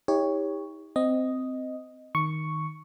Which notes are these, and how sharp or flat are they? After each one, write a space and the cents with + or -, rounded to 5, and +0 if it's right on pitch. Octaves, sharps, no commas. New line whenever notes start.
D#4 +45 G4 +30 C#5 +5
C4 -15 D#5 +0
D#3 +0 C#6 +0